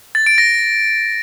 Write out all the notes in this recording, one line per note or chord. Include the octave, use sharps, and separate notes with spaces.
A6
D7
A#6